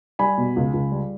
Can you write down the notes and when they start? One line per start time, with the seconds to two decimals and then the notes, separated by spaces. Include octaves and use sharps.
0.19 G3 G#5 B5
0.38 B2
0.56 C#2
0.73 C#2
0.92 G3